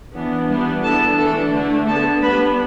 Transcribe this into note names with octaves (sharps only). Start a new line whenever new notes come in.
E3 B3 D4
E3 G3 B3 D4
E3 B3 D4 A4 A5
E3 A3 D4 A4 A5
D3 A3 D4
D3 B3 D4 A4 A5
G3 B3 D4 B4 B5